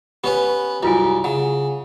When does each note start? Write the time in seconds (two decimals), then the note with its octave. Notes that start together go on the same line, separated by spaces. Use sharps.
0.24 B3 C#4 G4 B4
0.83 C2 F#2 E4 F4 G#5
1.24 C#3 F#5